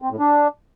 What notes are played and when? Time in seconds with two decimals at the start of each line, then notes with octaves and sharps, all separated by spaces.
0.02 C4
0.11 A2
0.19 D4